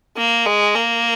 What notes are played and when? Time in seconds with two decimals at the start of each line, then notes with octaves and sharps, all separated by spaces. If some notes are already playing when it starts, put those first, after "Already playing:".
0.17 A#3
0.46 G#3
0.75 A#3